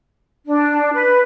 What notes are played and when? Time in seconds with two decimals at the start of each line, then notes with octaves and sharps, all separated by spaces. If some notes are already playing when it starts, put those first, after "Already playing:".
0.45 D4
0.93 B4